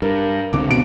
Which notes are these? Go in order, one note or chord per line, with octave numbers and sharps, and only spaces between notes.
G2 A#4
C#2 D3 C4 D6
B2 D7